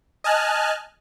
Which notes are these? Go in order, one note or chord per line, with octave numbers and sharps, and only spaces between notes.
D#5 G#5 A5 F6 F#6